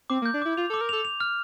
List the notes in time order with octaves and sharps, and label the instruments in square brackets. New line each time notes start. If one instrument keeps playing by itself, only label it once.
[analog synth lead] C4 [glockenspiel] D6
[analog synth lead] A#3
[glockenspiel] G6
[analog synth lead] D4
[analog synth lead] E4 [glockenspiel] D6
[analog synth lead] F4 [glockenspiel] F7
[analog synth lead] A4
[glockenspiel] D6
[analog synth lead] A#4
[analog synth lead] A4 [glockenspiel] F7
[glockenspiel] F7
F6